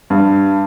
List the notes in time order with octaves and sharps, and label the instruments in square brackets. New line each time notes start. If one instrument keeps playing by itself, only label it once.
[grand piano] G2